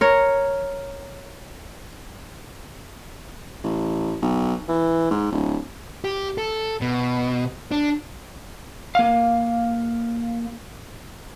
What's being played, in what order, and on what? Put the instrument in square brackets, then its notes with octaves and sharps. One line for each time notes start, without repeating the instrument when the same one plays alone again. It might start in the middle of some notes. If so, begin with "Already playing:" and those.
[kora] A#4 C#5
[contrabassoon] A1
B1
E3
G#2
D1
[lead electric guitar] G4
A4
B2
D4
[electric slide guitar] A#3 F5